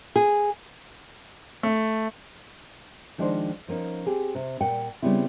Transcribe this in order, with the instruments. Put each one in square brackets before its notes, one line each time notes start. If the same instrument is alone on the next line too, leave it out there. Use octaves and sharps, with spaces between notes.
[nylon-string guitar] G#4
[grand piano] A3
[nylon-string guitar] D#3 F3 G#3 D4 D#4 C5
F3 A#3 C#4 D#4
C4 G4 G#4
C3
A#2 F#5 G5
C#3 G3 B3 C4 E4